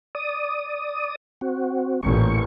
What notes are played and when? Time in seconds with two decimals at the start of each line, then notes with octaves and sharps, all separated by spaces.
0.15 D5 D#6
1.41 C4 F#4
2.03 A1 A#2 C#6